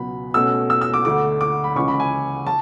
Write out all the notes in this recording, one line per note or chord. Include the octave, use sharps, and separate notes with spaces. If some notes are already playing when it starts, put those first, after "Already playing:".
Already playing: C#2 B2 F#3 B5
B2 A3 C#4 E6
E6
E6
D6
D2 D3 A3 D6
D6
B5
C#2 C#3 E3 G#3 C#4 C#6
B5
G#5
A5